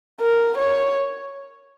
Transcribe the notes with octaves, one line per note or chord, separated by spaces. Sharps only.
A#4
C#5